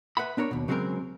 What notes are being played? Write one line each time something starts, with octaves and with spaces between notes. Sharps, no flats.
B4 E5 F#5 B5
B3 D4 A#4 C#5
D#2 B2
C#3 F#3 G#3 A#3 C4 A#4